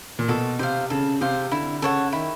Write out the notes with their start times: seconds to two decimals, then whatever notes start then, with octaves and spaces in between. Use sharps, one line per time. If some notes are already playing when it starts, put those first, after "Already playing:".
0.19 A#2
0.28 B2 A4
0.59 C3 C5 F5
0.90 C#3 A4
1.21 C3 C5 F5
1.51 D3 E4
1.82 C#3 A4 C#5 F#5
2.13 D#3 E4